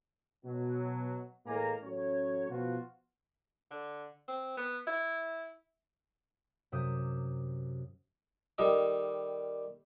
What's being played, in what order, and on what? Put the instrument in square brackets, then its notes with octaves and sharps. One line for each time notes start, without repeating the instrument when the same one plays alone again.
[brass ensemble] B2 F#3
A2 E3 G#3 A#3 G#5 A#5
A1 F#3 C#4 C#5
B2 F3 B3 F4 F#4
[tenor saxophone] D3
C4
B3
E4
[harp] F#2 C3 E5 D6 D#6 G6
[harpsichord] D#3 G3 A4 D#5